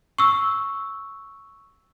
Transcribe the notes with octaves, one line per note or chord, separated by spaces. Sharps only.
C#6 E6